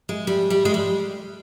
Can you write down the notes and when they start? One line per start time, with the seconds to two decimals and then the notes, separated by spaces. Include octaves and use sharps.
0.09 G#3
0.27 G3
0.50 G3
0.65 G#3
0.74 G3